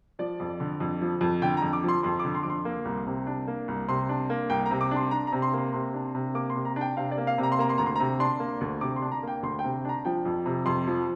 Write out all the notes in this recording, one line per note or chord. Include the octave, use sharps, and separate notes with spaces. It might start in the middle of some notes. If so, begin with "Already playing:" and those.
F3 D5
F2
D3
F2
F3
F2
D3 G5
A#5
F2
D6
F3 C6
F2 C6
D6
D3
C6
F2 D6
C6
A#3
C2
C3
D4
A#3
C2
C3 C6
D4
A#3
C2 G5
A#5
C3
D6
D4 C6
D4 A#5
A#5
C3
C6
A#3 C6
C3 C6
D4
C3
A#3 D6
C6
C3
A#5
D4
G5
C3 F5
D5
A#3
F5
C3
A#5
C6
A#3 A#5
C6
D2 A#5
C6
C3 A#5
D4 C6
A#3
D2
C3 D6
C6
D4
A#5
A#3 G5
D2 C6
G5
C3
D4 A#5
F3 G5
F2
C3
F2 C6
F3